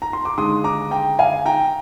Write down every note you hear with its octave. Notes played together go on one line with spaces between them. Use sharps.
A#5
C6
D6
D#2 D3 G#3 C6 D#6
A#5 D6
G5 A#5
F5 G#5
G5 A#5